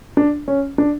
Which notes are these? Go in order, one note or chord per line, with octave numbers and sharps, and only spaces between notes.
D4
C#4
D4